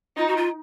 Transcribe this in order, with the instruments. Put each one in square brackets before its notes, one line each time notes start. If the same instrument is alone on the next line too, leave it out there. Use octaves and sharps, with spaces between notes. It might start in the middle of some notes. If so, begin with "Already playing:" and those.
[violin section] D#4 [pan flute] F4
[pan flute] F#4
F4